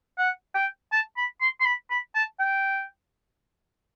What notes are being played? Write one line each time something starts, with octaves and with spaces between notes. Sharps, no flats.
F#5
G5
A5
B5
C6
C6
B5
B5
A5
G5